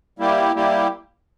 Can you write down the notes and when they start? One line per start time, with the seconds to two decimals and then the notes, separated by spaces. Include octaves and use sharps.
0.19 G3 A#3 E4 G4
0.54 G3 A#3 E4 G4